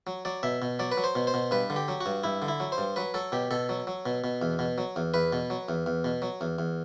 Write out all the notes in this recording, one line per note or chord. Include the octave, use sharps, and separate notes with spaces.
F#3
F#3 D5
B2 E5
B2
F#3 D5
B4
F#3
C5
B2
C5
B2
G2 B4
D3
G4
F#3
F#4
G2
G2 E4
D3
E4
F#3
C5
G2
F#3 B4
F#3 A4
B2 G4
B2 A4
F#3
F#3
B2
B2
E2
B2
F#3
E2
E2 B4
B2
F#3
E2
E2
B2
F#3
E2
E2